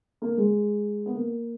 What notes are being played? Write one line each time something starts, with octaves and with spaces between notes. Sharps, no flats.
A#3
G#3
B3
A#3